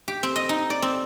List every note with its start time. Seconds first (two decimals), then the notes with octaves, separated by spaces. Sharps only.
0.08 G4
0.23 C4
0.36 D#5
0.49 D#4
0.70 D5
0.82 C4